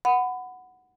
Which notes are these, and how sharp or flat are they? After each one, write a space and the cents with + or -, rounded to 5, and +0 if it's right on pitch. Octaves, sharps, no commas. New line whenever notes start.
F#5 +0 B5 +25